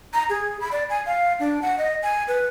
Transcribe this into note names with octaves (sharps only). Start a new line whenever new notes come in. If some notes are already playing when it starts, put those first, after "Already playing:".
A#5
G#4
B5
D5
G#5
F5
D4
F#5
D#5
G#5
B4